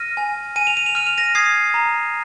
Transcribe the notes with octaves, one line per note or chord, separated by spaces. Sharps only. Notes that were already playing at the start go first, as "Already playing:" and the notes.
Already playing: F6 A#6 D#7
G#5
G#5 D#7
F7
D#7
F7
F6 D#7
F7
A#6 D#7
D#6 G#6 C7
A#5